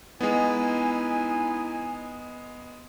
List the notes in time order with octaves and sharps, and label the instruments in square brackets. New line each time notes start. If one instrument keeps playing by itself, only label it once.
[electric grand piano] G#3 B3 [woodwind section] D#4 E4 G#5